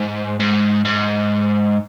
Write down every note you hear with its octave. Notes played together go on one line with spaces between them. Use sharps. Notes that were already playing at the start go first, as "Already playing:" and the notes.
Already playing: G#2
G#2
G#2